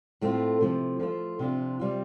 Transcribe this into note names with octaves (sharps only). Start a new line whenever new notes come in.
A2 A3 C4 F4
C3 F3 A3
F3 A3 F4
C3 F3 D4 F4
C3 G3 C4 F4